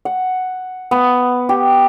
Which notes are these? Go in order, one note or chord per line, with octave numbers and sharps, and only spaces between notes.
F#5
B3
G4